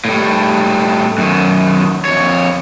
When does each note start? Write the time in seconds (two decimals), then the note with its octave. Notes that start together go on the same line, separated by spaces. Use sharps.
0.05 A2 G3
1.18 F#2 D#3
2.05 F2 C#5